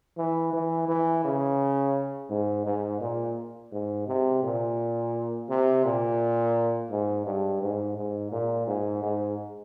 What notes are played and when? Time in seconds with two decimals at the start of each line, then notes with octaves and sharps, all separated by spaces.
0.18 E3
0.53 E3
0.88 E3
1.25 C#3
2.30 G#2
2.66 G#2
3.01 A#2
3.72 G#2
4.07 C3
4.43 A#2
5.49 C3
5.85 A#2
6.90 G#2
7.26 G2
7.62 G#2
7.96 G#2
8.32 A#2
8.67 G#2
9.03 G#2